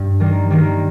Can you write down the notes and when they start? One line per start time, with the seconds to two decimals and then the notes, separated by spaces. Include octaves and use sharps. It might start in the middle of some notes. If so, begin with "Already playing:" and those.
Already playing: G2
0.20 D#3 G3 A#3
0.50 D#3 G3 A#3